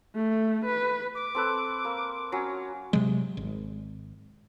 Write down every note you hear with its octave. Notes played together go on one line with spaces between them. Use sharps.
A3
B4
D6
C4 A4 B4
A#3
F#3 C#4
C3 F#3 G#3
G#1